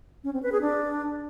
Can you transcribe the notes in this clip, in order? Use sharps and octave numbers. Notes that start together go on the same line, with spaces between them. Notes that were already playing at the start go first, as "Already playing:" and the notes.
C#4
C4
B4
G#4
D4